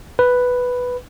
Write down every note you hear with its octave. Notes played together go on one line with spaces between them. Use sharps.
B4